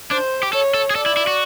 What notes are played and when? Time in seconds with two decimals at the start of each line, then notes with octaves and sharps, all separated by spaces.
0.11 D4 C5
0.43 G4
0.53 A4 C#5
0.74 A4
0.90 G#4
0.95 A4 D5
1.06 E4
1.17 E4
1.27 F#4